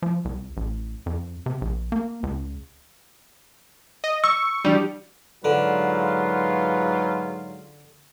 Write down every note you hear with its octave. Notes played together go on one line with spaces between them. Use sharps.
F3
C2
A1
F2
C3
A#1
A#3
C#2
D#5
C#6 E6
E3 G3 D4 F#4
G#2 D3 F#3 F4 B4